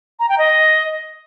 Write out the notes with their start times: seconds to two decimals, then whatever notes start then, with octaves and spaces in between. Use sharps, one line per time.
0.20 A#5
0.29 G5
0.38 D#5